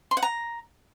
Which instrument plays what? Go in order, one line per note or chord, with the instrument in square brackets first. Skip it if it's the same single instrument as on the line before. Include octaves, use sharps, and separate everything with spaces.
[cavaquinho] C6
F#5
A#5